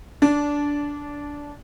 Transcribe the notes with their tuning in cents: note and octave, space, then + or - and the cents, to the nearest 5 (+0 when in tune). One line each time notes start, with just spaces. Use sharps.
D4 -15